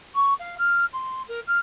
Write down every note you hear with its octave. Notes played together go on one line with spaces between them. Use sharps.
C#6
F5
F6
C6
A#4
F6